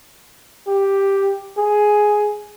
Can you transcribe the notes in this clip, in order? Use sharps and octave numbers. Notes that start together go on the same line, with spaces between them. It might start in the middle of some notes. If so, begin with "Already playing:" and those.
G4
G#4